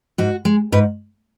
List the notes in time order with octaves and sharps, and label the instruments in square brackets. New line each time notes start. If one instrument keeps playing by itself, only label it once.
[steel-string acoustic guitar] G#2 F#4
G#3
G#2 B4